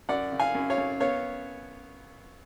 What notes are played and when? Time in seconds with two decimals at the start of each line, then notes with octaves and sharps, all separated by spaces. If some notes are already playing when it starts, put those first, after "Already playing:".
0.09 F#2 D5 F#5
0.32 C#3
0.40 F5 G#5
0.55 F#2
0.70 C#5 F5
0.78 F#2
1.00 B3 C#5 F5